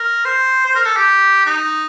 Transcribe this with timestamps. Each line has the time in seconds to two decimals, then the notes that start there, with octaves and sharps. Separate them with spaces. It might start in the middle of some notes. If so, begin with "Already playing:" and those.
Already playing: A#4
0.25 C5
0.66 C5
0.75 A#4
0.86 A4
0.97 G4
1.46 D#4